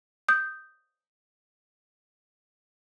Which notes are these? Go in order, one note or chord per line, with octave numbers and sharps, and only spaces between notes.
D#6 G6